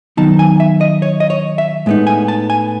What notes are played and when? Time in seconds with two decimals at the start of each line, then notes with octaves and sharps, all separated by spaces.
0.17 D#3 F#3 B3 D#4 A5
0.39 G#5
0.60 E5
0.81 D#5
1.02 C#5
1.20 D#5
1.30 C#5
1.58 E5
1.86 A2 G#3 B3 D#4
2.07 G#5
2.28 A5
2.50 G#5